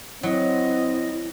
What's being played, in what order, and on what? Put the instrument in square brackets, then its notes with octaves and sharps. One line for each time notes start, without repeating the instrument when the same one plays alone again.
[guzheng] F#3 [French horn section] C4 [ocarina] E4 [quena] D#5